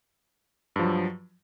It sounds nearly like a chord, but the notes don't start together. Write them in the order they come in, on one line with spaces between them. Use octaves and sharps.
G2 F3 F#3